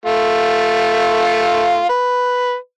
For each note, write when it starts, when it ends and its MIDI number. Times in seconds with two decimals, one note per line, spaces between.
0.06 1.85 57
0.06 1.85 65
1.89 2.55 71